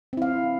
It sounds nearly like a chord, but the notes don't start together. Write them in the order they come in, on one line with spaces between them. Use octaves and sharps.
C4 E4 F5